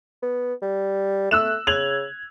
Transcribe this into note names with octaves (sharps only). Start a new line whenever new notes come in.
B3
G3
A3 E6 F#6 E7
C#3 G#6 F7 F#7